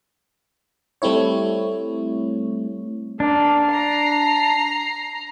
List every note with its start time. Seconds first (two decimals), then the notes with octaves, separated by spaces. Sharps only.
1.02 G3 A3 C4 E4 C#5
3.20 A#3 D4
3.69 A#5 C7